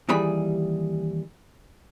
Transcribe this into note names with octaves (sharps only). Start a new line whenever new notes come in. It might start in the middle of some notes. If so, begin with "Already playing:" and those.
D#2 E3 G3 G#4 B5